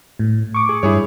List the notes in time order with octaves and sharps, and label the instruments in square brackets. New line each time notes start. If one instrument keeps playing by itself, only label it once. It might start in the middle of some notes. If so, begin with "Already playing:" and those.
[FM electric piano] A2
C#6 D6
[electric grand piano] G#4
[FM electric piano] G2 [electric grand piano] E4 G#4 C#5